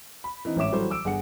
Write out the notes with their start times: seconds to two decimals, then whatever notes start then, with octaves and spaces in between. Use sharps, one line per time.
0.24 B5
0.45 E3 C4 D#4
0.56 A1 G#2 C#5 E5 D6 E7
0.72 E3 F#3 G3 F#4 A4 C5
0.91 D6 E6 D7
1.05 G1 G#4 F#5 C#7